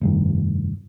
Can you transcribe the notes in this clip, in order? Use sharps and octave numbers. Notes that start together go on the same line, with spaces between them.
F1 G2 D#3